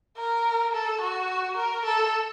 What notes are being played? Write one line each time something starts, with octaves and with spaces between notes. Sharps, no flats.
A#4
A4
F#4
A#4
A4